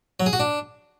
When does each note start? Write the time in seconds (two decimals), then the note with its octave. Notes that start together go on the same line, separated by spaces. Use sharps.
0.20 F#3
0.26 G#4
0.33 F#4
0.40 D4